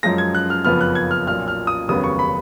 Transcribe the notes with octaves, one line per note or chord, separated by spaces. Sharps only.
F#2 F3 G#3 A#6
G#6
F#6
F6
F#1 F2 C#3 F3 B3 F6
F#6
G#6
F6
B1 A#2 F3 F6
F6
D#6
F1 D#2 C#3 F#3 B3 D#6
C#6
B5